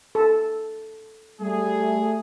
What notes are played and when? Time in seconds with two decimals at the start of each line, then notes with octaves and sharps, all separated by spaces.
0.15 A4
1.41 G3 A3 G#4